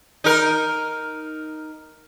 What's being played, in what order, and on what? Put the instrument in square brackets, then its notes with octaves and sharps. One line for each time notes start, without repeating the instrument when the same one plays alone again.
[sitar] D#4 A#4